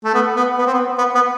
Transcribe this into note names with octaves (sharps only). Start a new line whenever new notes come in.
A3
B3
B3
B3
C4
B3
B3
B3